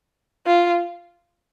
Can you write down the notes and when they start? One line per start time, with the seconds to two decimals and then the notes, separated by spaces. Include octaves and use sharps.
0.46 F4